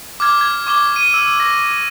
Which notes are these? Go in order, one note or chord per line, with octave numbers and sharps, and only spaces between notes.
D6 F6 G#6
G#6
C#6 D6 G7
D#7
E6
A#6